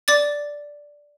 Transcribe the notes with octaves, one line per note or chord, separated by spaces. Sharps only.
D5 D6 A6